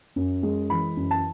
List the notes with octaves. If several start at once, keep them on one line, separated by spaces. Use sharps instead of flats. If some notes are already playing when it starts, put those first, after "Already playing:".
F#2
G#3
E3 B5
F#2
A5